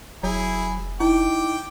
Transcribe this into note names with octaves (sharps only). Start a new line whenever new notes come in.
F1 F#3 E4 G#4
D#4 E4 G5 D6